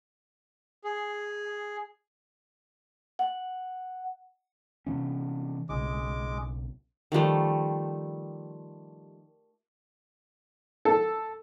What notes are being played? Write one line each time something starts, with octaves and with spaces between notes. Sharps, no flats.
G#4
F#5
C3 E3 C#4
B1 C#3 G#3 D6
D#3 F3 G3 A3
A4